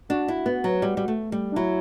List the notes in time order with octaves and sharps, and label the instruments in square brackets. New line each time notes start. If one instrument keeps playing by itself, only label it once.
[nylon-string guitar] D4 [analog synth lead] F#4
[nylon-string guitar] E4
B3
F#3
G3
G3
A3
G3
[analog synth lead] D4
[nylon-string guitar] F#3 [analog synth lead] E4